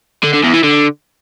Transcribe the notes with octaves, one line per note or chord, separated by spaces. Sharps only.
D3
D3
E2
E3
D3